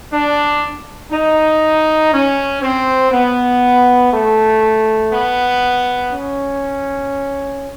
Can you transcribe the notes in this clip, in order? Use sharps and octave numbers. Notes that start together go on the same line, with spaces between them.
D4
D#4
C#4
C4
B3
A3
B3
C#4